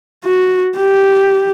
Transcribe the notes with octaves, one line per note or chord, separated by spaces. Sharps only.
F#4
G4